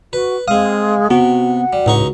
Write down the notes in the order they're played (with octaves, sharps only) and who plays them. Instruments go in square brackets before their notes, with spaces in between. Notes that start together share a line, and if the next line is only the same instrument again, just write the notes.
[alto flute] F#4 [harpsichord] B4
[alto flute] G#3 [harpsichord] C4 D#6 [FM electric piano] F5
[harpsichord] C3 [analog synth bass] B3 [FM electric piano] F#4 [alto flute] F#5
[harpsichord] G3
[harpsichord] C#2 D#4 C#6 [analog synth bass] A2